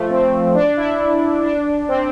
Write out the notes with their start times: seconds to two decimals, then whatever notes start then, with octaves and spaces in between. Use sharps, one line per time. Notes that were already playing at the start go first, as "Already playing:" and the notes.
Already playing: F3 A3
0.10 C4
0.55 D4
0.77 E4
1.44 D4
1.89 C4